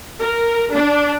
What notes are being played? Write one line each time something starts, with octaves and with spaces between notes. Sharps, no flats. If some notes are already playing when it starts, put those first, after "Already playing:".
A#4
D4